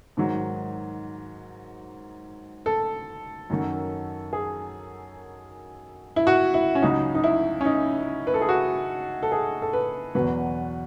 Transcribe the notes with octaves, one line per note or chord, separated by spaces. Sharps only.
G#2 D#3 F#3
A4
F#2 D#3 F#3
G#4
E4
F#4
E4
C#4
C#2 C#3 F#3 D#4
D#4
E4
C#4
D#4
B4
A4
G#4
F#4
A4
G#4
A4
B4
E2 B2 F#3 B4